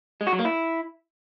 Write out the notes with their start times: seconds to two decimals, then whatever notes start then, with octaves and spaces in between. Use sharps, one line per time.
0.21 G#3
0.27 F#4
0.33 F#3
0.39 A#3
0.45 E4